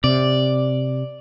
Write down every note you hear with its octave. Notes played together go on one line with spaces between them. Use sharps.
C3 D5